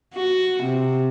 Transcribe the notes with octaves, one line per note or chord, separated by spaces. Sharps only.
F#4
C3